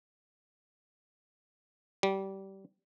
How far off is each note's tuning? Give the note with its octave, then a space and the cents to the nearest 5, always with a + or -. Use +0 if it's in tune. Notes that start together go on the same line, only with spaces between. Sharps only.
G3 -20